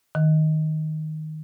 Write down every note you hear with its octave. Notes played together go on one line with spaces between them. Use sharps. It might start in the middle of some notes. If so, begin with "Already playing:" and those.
D#3